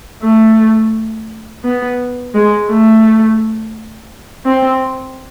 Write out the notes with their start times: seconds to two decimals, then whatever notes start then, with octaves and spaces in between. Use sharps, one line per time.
0.23 A3
1.64 B3
2.34 G#3
2.69 A3
4.46 C4